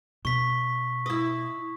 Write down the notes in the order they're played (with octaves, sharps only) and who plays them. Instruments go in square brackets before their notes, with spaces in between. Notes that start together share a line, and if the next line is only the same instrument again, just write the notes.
[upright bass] B2 [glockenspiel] C#6 B6
[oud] E4 D#5 [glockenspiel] D#6